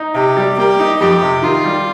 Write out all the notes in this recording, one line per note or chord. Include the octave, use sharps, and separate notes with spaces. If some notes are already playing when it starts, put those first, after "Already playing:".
Already playing: D#4
C3 G4
G3
A#3 G4
D#4
F2 G4
C3
D#3 F4
G3